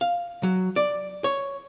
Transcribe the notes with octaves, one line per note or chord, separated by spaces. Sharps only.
F5
F#3
D5
C#5